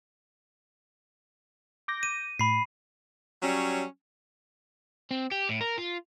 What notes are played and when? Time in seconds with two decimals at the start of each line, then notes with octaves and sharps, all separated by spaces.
1.88 D6 G6 A#6
2.03 D#7
2.39 A2 B5 C7
3.43 F#3 G3 C#4
5.11 C4
5.31 G4
5.49 A2
5.61 A#4
5.78 F4